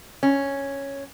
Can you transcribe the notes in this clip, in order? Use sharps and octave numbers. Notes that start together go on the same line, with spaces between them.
C#4